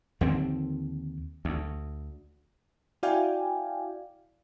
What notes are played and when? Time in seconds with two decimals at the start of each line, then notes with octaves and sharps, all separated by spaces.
0.21 D#2 D3 F3 C4
1.45 D2
3.03 E4 F#4 D5 F5 G5 G#5